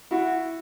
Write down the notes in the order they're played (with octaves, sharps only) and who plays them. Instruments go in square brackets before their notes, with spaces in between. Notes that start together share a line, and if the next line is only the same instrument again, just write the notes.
[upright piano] E4 [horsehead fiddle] F#4